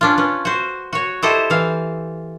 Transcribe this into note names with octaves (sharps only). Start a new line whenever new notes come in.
C#4 D4 F4
C#4 B4
F#4 C5
F#4 C#5
E4 G4 A4 C5 D#5
E3 F5